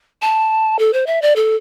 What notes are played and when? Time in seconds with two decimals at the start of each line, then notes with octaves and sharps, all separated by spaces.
0.22 A5
0.79 A4
0.93 C5
1.06 E5
1.22 D5
1.36 A4